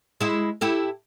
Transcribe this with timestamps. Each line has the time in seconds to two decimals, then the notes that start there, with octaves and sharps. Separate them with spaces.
0.21 G#3 E4
0.61 E4 G4 A4